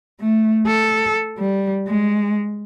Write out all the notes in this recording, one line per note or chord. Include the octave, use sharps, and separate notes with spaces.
A3
A4
G3
G#3